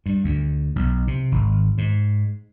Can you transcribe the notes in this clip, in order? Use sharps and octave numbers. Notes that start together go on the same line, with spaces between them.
G2
D2
B1
C3
G#1
G#2